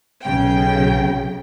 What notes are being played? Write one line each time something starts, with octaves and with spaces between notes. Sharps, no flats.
B1 C#3 G5